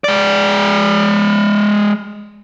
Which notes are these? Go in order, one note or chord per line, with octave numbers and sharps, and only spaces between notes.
G#3 D5